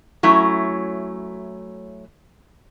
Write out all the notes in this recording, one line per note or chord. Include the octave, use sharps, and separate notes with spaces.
F#3 A3 C#4 E4